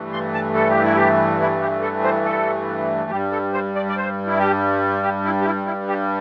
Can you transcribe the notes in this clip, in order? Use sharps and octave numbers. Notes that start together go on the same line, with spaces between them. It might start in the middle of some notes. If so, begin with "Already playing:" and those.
Already playing: G2 E3 A3
C6
A5
A4
G4
E4
G4
E4
G4
A4
C5
A4
G2 G3 G4
A4
C5
D5
D5
C5
E4
G4
G4
E4
G4
E4
E4
G4